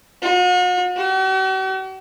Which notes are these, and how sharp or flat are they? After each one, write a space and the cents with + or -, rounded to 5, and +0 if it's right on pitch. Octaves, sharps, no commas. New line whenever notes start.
F#4 -45
F#4 +45